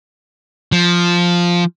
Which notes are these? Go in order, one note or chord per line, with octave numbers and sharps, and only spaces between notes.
F3